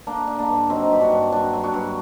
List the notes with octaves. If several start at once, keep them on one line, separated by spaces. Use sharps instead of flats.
D3 A#3 D4
D3
A#3 D4
G2
F#3 C4 D#4
G2 G4
D4 F#4
G2
F#3 D4 F#4
F#3
D4 F#4
G2